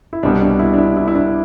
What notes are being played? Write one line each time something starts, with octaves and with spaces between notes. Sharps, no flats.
E4
C2 B2 G3 D4
D4
E4
D4
E4
E4
E4
D4